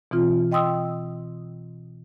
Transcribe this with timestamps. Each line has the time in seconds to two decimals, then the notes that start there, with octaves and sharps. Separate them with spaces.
0.11 B2 E3 C4 F4
0.52 D#5 G5 C6 D#6 E6